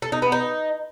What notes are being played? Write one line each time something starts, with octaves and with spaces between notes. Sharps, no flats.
A4
D#4
B3
D#4